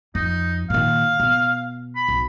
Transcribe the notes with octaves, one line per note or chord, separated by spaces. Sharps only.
F2 D#4
A#2 D#3 F5
B2
B5
B1